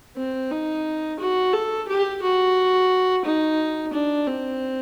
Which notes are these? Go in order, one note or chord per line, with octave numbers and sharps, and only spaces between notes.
C4
D#4
F#4
A4
G4
F#4
D#4
D4
C4